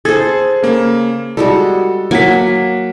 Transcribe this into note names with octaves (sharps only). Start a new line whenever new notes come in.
G#4 A4 C5 G#6
C#3 A#3
G3 G#3 F#4 A4
F#3 A#3 F#5 G#5 D6 B6